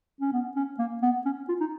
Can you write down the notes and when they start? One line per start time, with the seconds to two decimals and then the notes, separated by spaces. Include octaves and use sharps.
0.21 C#4
0.32 B3
0.56 C#4
0.79 A#3
1.02 B3
1.25 C#4
1.49 F4
1.60 D#4